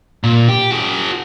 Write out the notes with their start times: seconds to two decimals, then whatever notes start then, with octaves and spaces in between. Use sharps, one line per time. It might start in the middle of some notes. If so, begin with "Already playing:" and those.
0.24 A#2
0.48 G4
0.71 F#4 G#4